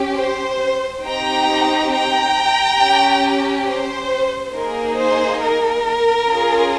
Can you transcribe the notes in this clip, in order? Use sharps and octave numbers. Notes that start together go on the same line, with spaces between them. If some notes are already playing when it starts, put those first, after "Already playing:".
Already playing: C#4 G4
C5
C4 D#4 G4 G5 A#5
G5 A#5
C#4 G4
C5
A#3 D#4 G#4 A#4
C5
A#4
C#4 F4 G#4